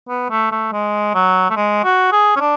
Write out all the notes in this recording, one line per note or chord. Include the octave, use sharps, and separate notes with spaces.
B3
A3
A3
G#3
F#3
A3
G#3
F#4
G#4
C#4
D4